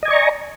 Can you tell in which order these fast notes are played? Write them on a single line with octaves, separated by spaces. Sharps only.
D#5 G#5 D5 C#6 A#5